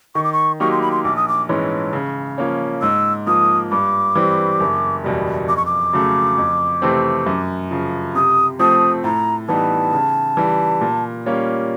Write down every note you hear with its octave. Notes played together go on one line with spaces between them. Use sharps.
D#3 C#6
D6
C#6
F#3 A#3 D#4 G4 C#6
C6
B5
C6
A#1 D6
D#6
D6
G#2 E3 G#3 C#4
C#3
F3 A#3 C#4
G#2 E6
F3 A#3 D#6
G2 D6
E3 G3 C4
F#1
E2 B2 G3
F2 D6
C#6
D6
C#3 F#3 A3
F2
C3 E3 A3 C4
F#2
C#3 F3
C3 D#6
F3 A3 C4 D#6
A2 A#5
E3 G3 B3 D#4 A5
C#3
E3 G3
A#2
G3 A#3 C#4 F4